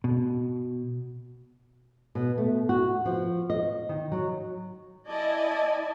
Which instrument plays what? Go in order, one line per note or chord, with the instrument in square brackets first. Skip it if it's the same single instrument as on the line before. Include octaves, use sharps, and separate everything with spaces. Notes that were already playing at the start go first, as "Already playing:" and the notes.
[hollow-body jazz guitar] B2
[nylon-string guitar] B2
A3
F#4
F3
D#5
D#3
F#3
[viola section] E4 D5 D#5 G#5 A5